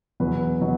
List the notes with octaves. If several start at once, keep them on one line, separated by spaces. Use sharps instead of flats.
E2 B2 F#3 B4
B2 F#3